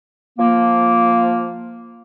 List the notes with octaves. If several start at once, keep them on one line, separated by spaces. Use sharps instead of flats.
F3 A#3